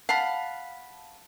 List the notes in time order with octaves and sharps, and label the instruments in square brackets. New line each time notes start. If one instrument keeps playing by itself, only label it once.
[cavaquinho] F5 F#5 A5 B5